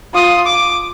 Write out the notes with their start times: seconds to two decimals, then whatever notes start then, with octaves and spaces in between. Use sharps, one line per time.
0.14 F4 D#6
0.46 D6